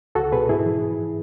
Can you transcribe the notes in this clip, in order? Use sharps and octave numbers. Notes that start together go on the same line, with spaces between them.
C#2 F#4 A4
B2 G#4 B4
G#2 E4 G#4
E3